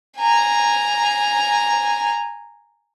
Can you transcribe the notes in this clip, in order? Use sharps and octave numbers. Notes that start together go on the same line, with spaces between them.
G#5 A#5